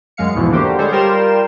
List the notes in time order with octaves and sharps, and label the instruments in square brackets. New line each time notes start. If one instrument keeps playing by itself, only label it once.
[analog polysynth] F#2 G#3 F5 C#7
E2 G#2 B2 E3 F3
D3 A#3 F#4 G4 C5
G3 G#3 A4 C5 C#5
G3 F4 A#4 G5 C6 E7